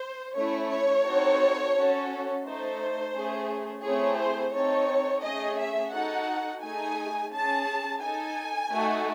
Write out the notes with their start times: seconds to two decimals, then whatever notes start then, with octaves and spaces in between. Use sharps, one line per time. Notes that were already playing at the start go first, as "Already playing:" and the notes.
Already playing: C5
0.35 A3 C#4 E4 C#5
0.70 C#5
1.04 C4 D#4 F#4 A4
1.75 C#4 F#4 A4
2.44 A3 D#4 A4 C5
3.14 A3 C#4 G#4
3.83 A3 C4 E4 G#4 C#5
4.19 C5
4.53 C4 D#4 A4 C#5
5.22 A3 C#4 G#4 D#5
5.58 E5
5.92 D#4 F#4 A4 F#5
6.63 A3 D#4 G#4 G#5
7.32 C#4 G#4 A5
8.01 D#4 A4 G#5
8.71 A3 D#4 F#4 A4